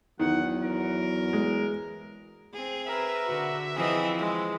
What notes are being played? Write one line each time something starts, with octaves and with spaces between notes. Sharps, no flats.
E2 D#3 F#3 F#5
A#4
G#3
C4 G#4
A#4 B4 E5
D3 F#4
E3 F3 C4 G#4 D#5
G#3